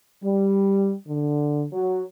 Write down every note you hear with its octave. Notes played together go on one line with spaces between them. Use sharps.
G3
D3
F#3